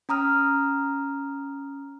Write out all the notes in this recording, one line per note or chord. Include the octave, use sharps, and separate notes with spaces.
C#4 A#5 D#6 F6